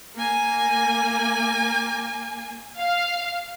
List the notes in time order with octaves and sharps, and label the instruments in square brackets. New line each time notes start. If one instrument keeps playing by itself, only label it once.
[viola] A#3 G#5
[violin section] F5